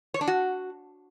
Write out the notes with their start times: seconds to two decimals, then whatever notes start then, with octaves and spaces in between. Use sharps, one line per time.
0.14 C#5
0.21 D4
0.28 F#4